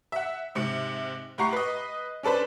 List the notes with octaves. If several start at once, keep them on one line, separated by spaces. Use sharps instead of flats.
E5 F#5
G#2 C3 C#7
A2 G4 F#5 A#5 C#6 C7
B4 D#5
C#4 D4 A4 B4 C5